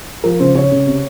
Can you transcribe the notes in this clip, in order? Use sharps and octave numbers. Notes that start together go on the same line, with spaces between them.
F3 A#4
C#3 C5
C#3 C#5
C#3
C3